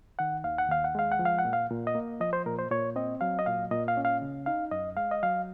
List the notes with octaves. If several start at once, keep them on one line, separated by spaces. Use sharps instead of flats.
D#3 F#5
D#2 F5
F#5
D#2 F5
F#5
G#3 F5
F#5
F3
F5
F#5
A#2
F5
A#2
D#5
A#3
F3 D#5
C5
A#2 A#4
C5
A#2 C#5
C4 D#5
F#3 F5
D#5
A#2 F5
A#2 D#5
F5
C#4
F5
C#3
D#4 F5
F#2 D#5
G#3 F5
D#5
F#3 F5